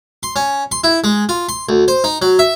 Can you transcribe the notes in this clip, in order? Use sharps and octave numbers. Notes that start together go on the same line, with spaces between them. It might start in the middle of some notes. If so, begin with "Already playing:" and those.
C6
C#4
C6
E4
G#3
F4
C6
D2
C5
D#4
F#3
E5